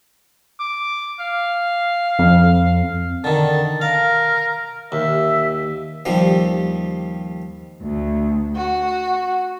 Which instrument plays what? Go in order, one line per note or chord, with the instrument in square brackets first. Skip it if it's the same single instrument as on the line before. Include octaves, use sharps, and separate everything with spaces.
[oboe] D6
F5
[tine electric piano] F2
[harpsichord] D3 D#3 [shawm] A5
[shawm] A#4 [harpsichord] F5
[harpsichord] D#2 [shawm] E5
[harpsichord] D#2 F3 G3
[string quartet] D2
F#4